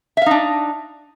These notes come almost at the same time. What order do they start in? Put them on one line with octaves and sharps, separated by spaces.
E5 F5 D#4 D4